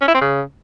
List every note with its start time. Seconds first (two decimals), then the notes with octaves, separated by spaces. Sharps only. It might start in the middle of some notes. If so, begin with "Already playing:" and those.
0.01 C#4
0.08 E4
0.14 C4
0.21 C#3